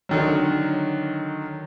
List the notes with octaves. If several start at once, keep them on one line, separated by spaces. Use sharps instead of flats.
D3 D#3 F#3